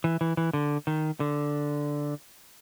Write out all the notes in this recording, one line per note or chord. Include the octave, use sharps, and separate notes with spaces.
E3
E3
E3
D3
D#3
D3